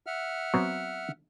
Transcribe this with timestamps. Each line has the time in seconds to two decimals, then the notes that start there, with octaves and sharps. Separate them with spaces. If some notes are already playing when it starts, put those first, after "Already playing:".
0.06 E5 F#5 F6
0.54 F#3 B3 C4